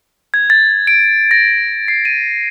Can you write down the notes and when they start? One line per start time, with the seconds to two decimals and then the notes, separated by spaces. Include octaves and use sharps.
0.34 G#6
0.50 A6
0.87 D7
1.31 A#6
1.88 C7
2.05 D#7